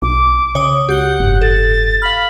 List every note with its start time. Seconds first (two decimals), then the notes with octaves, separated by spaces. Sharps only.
0.02 B1 D6
0.55 C#3 C#5 D#6
0.89 C#2 F#4 G4 F#5 G6 G7
1.20 F#1 F2 G#2
1.41 A4 A6
2.02 F5 B5 F6